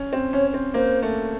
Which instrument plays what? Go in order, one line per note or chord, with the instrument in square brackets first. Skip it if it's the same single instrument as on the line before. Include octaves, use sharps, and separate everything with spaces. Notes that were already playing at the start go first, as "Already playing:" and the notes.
Already playing: [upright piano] C#4
C4
[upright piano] C#4 [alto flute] C#5
[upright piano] C4
[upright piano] A#3 [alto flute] C5
[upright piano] A3